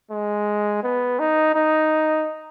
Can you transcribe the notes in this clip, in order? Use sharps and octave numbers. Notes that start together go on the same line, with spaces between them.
G#3
B3
D#4
D#4